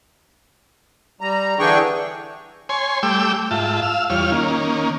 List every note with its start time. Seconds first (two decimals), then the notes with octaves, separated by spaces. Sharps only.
1.21 G3 A#5
1.59 D3 E3 D4 G#4 G5 C#6
2.69 C#5 G#5 C6
3.03 G3 A3 G5 D6 E6
3.51 G#2 F4 E5 A5
3.82 F5 E6
4.10 E2 G3 F4 C#5 F6
4.32 D#3 A#3 C#4